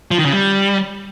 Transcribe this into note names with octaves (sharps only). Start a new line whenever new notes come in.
F3
D#3
C#3
G3